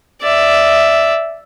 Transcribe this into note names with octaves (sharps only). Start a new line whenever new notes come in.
D5 E5